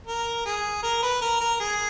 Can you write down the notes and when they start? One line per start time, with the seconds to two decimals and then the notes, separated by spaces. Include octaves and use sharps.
0.07 A#4
0.45 G#4
0.83 A#4
1.03 B4
1.21 A#4
1.41 A#4
1.60 G#4